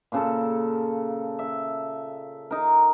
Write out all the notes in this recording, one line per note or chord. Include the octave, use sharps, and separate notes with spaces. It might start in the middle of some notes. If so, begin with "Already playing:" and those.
A#2 C#3 A4
E5
D#4 A#4